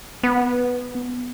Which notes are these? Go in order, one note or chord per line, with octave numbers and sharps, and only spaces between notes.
B3